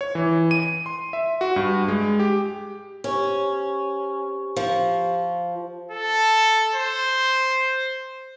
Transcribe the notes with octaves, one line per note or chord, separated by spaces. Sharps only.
C#5
E3
D#7
C6
E5
F#4
G2
G#3
G4
C#4 G4 C5 C#6
F3
A4
C5